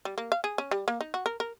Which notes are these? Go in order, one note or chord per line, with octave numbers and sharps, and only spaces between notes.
G3
A#3
F5
G#4
C#4
G3
A#3
D#4
F#4
A#4
A#4